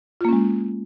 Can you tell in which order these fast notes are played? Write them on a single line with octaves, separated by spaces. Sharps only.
F4 A#3 C#4 G#3